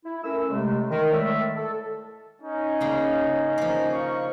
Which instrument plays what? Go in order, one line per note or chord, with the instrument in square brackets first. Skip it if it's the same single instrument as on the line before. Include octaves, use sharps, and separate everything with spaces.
[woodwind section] E4
A3 C#4 A#4 E6
A2 C3 G#3 A3
D#3
A2 G#3 A3 D5 E5
A4
[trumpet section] C#4 D#4
[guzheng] C#3 A#3
F3 A#3
[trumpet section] D#4 F5 C#6